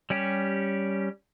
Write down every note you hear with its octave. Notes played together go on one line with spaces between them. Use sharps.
G3 C#4 G4